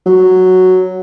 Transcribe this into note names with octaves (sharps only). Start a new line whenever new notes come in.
F#3